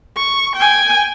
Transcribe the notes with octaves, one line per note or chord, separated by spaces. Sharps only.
C#6
G5 G#5